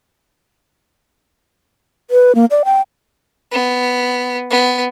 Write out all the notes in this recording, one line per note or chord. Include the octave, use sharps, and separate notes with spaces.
B4
A#3
D5
G5
B3
B3